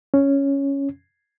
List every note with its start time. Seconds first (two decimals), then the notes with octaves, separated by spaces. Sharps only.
0.14 C#4